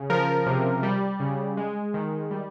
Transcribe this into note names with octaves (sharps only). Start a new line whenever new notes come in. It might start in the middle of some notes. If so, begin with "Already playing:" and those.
Already playing: C#3
F3 A#4
C3
G3
C#3
G#3
D#3
G3